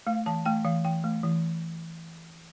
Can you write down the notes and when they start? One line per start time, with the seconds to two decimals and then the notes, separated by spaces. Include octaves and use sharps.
0.07 A3 F5
0.26 E3 A5
0.45 A3 G5
0.65 E3 F5
0.85 E3 G5
1.04 A3
1.23 E3